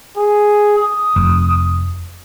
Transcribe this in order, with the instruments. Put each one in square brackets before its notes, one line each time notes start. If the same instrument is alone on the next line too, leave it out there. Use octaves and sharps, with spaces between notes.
[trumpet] G#4
D#6
[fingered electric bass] F1